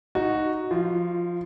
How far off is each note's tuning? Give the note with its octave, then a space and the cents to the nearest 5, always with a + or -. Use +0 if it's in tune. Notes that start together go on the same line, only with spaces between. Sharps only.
D#4 +0 F#4 +0
F3 +0 F4 -25